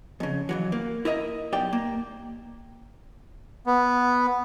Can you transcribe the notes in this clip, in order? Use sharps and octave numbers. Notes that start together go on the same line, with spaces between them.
F2 C#3
F2 E3 F#3
A#3
E4 A#4 D#5 E5
B1 G4 D5 G5
A#3
B3